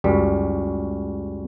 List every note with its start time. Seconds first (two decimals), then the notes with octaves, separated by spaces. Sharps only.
0.04 C#2 F#2 G3